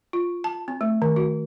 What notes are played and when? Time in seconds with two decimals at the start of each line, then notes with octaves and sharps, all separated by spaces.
0.13 F4
0.44 A5
0.68 C4
0.81 A3
1.02 D#3
1.16 F#4